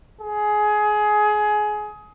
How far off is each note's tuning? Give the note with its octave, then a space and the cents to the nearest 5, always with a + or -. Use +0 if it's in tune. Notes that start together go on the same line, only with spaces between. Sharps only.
G#4 +20